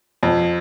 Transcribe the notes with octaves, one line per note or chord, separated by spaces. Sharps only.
F2